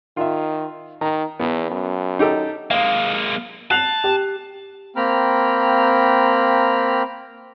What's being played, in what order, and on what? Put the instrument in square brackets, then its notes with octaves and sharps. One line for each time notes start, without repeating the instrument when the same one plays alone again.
[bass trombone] D#3 [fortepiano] F4 E5
[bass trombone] D#3 [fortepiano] A#5
[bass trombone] E2 [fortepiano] B3
[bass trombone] F#2
[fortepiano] D#4 G4 A4
[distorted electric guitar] G#3 A#3 [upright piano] F5
[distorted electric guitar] A5 [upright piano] F#6 C7 F7
[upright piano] G4
[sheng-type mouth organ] A#3 C4 G5 A#5 B5 F6